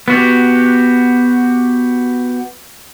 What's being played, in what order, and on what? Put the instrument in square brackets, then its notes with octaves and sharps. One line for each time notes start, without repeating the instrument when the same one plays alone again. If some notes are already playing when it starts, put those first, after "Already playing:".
[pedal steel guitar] B3 F#4 G4